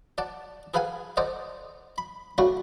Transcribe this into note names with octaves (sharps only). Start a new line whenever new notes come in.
D5 F#5 A5
G#4 A4 B4 F5 F#5 G#5
A4 C5 D5 D#5 F#5
B5
C#3 G3 A3 E4 F#4